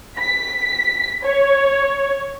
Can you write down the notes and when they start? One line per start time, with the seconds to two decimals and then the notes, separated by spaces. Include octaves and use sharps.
0.18 B6
1.23 C#5